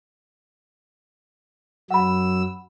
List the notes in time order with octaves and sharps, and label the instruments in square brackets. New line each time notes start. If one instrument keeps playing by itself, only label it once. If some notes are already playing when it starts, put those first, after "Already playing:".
[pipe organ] F#2 F#3 E6 [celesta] F#5 B5